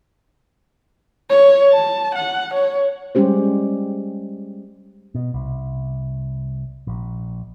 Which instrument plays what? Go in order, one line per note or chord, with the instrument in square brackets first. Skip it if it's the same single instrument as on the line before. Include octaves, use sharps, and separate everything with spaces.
[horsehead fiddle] C#5
A5
F#5
C#5
[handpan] G3 G#3 C#4 G4 C5
[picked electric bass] B2
C2
A#1